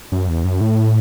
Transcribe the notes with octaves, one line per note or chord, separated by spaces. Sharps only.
F#2
E2
F#2
A2